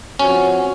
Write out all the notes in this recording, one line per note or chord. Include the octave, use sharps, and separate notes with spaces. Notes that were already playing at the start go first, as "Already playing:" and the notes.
F3 C4 C#4 F#4